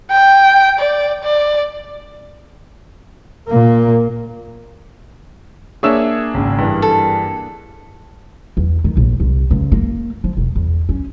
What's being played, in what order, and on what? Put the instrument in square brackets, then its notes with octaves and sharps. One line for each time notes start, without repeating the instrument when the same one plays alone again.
[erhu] G5
D5
D5
[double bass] A#2 A#3
[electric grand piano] A#3 D4 G#4 [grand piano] C#5 E5 E6
[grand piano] G#1 C#3
G2 E3 G3
[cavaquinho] A4
[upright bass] E2
D#3
A#1
C2
C#2
A#3
F3
E1
E2
C#4